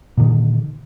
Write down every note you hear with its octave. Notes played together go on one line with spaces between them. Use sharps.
A#2 D3 D#3